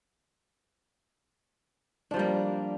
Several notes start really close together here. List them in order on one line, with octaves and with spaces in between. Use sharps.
D4 F3 G3 A#3